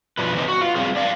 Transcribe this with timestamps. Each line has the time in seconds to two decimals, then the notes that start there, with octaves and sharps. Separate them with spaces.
0.18 B2 F3 G3 B4
0.35 E3 B3 C4 D#4 G4
0.48 F#4
0.61 F4
0.75 G3 C4 F4 G#4
0.96 D4 D5 F5